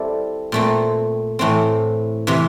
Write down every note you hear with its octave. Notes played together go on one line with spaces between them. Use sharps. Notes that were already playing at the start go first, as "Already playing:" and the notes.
Already playing: G3 C4 E4 A4 D5
A#2 A3 C4
A2 E3 A3 C4
C3 E3